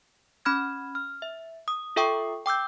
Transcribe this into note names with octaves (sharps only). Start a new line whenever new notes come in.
C#4 B5 F6 G#6
F6
E5
D#6
F4 A4 E5 G5 C#6 D#6
G5 D6 E6 G6